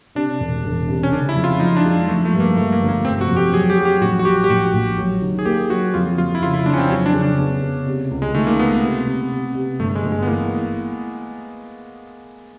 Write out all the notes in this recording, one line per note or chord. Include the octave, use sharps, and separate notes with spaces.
C3 D4
E1
E1
C3
C#4
C#3 D4
E4
F2
F4
F3 D#4
D4
G#3
F3 A3
A3
G2
A#3
F3 A3
A#3
G1
A#3
F1 C4
F#4
F2
G4
F#3 G#4
G4
F#3
G4
A#1 F#4
F#4
F#3 G4
G4
A#1 F#4
A#1
F#3
D#3
G#4
A#3 G4
F#3 F#4
F2 F4
F2 F4
E4
C#3 F4
E4
F2 D4
C#4
C4
F#3 C#4
D4
C#3
D4
B3
C#3
C3
C#2
G#3
D#3 A3
A#3
C#2 B3
C3
C3
C3
C3
G1 A3
G#3
G1
G#3
B3
E3 A#3